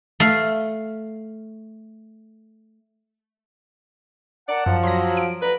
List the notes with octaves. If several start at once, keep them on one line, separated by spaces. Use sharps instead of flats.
A3 F5
A#4 D5 F#5 A5
F#2 F3
F#3 C6 A#6
D7
D2 B4 A#5 B5